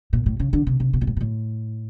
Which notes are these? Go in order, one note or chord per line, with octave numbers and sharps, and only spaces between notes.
A#2
A2
C#3
D3
C3
C3
B2
A#2
A2
A#2
A2